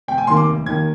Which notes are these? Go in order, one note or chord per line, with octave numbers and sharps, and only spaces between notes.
F1 G5
G#5
D#2 D#3 A#3 C6
D6
F1
D#2 D#3 A#3 G#6